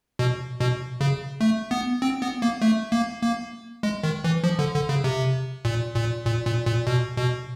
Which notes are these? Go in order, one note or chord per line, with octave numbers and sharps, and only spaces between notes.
B2
B2
C#3
A3
B3
C4
B3
A#3
A3
A#3
A#3
G#3
D#3
E3
F3
D3
D3
C#3
C3
A#2
A#2
A#2
A#2
A#2
B2
B2